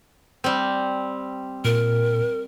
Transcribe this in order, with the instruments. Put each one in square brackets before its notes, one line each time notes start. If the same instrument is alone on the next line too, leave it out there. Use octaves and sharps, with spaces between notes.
[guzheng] G3 C4
[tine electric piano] A#2 [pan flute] A#4